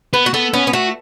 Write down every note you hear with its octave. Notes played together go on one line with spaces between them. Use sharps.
B3 B4
F#4
B3 A4
B3 C#4
B3
A3 F#4